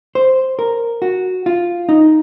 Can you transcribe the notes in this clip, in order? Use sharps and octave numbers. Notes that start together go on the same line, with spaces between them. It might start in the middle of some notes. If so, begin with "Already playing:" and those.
C5
A#4
F#4
F4
D#4